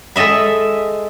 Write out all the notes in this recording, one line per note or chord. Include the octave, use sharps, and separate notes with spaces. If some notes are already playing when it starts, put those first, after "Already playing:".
G#3 A4 D#5 E5 B5